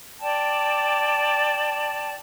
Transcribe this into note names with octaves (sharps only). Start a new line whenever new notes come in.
D5 G5 A5